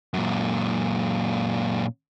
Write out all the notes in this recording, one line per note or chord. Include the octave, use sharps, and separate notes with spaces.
F#2 A#2